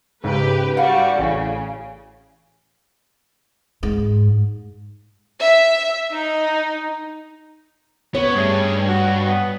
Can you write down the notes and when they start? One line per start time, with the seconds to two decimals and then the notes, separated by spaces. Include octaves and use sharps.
0.24 G#2 C#3 G4 B4
0.77 G3 F#4 F5 F#5
1.19 A1 C#3
3.83 G#2
5.39 E5
6.12 D#4
8.15 B3 C#5
8.35 G2 G3 A3 G#4
8.88 F#4
9.27 B3